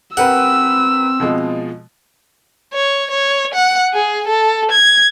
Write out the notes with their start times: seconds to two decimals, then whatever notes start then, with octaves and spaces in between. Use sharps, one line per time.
0.17 C4 G4 A#4 B4 F#5 E6
1.20 B2 F3 G#3
2.74 C#5
3.11 C#5
3.54 F#5
3.93 G#4
4.28 A4
4.71 G#6